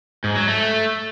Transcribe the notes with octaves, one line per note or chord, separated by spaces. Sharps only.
G#2
F#3
A3